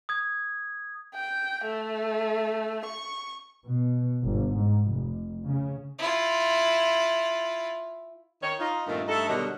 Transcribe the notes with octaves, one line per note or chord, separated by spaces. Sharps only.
D#6 G#6
G5
A3
C#6
B2
G1
G#2
F1
C#3
E4 F4
D#3 C#5
D#4 F4
G2 A#2 D#3 A3 C4 F4
G2 A3 D#4 A4
B2 D3 D#3 F#3 G3